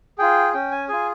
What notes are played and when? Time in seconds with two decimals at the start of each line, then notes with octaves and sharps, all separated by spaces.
0.18 F4 G#4 G5
0.54 C#4 G5
0.71 G#5
0.89 F4 G#4 G#5